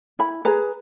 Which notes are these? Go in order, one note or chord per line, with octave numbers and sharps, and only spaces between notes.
E4 B5
G#4 B4 A#5